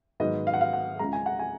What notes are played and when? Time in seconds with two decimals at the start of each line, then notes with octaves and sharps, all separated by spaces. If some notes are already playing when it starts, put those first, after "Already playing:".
0.20 G#2 D#3 F#3 B3 D#4 D#5
0.47 F5
0.54 F#5
0.61 F5
0.73 F#5
0.99 C#2 C#3 G#3 A#5
1.13 G#5
1.26 F#5
1.39 G#5